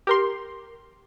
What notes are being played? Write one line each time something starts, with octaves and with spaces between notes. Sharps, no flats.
G4 A#4 C6